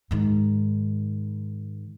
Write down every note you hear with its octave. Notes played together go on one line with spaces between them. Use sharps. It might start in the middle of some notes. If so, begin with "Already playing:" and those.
G#2 D#3